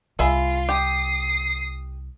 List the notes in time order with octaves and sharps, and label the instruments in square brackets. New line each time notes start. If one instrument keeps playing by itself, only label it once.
[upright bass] C2 [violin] F4 [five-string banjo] G#4 E5 B5
[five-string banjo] G4 [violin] D#6 C7